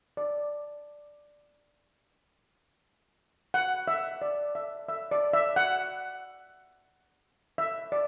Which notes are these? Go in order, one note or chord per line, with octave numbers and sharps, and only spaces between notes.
D5
F#5
E5
D5
E5
E5
D5
E5
F#5
E5
D5